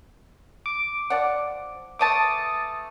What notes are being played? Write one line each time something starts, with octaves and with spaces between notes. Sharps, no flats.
D6
F3 D5 F#5
E3 A3 A5 D6 D#6 A6